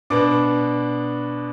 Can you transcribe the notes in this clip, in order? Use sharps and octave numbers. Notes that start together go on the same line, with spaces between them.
B2 B3 D4 D6